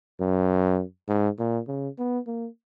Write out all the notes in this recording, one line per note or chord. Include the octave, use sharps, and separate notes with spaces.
F#2
G#2
A#2
C#3
B3
A#3